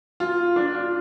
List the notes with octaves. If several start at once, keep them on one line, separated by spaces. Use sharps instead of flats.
F4
D4
F4